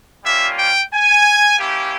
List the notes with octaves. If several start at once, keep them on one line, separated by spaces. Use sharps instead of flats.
G3 A#3 C#4 F4 E5
G5
G#5
A#3 C#4 E4 G4